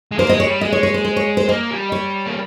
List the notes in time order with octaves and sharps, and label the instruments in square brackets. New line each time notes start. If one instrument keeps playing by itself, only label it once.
[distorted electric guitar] G#3
[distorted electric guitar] A#3 [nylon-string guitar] C5
[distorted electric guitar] G#3 [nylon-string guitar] D#5
[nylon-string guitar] C#5
[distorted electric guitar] G3
[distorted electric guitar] G#3 [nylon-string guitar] D#5
[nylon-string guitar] C#5
C#5
C5
C5
C#5
C5
[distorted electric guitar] A#3 [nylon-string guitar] D#5
[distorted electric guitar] G3
[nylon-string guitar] C#5
[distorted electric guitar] A#3